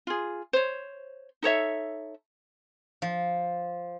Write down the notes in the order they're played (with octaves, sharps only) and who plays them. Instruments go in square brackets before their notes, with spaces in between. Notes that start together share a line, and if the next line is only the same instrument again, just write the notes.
[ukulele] F4 G#4
C5 C#5
D#4 A4 C#5 E5
[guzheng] F3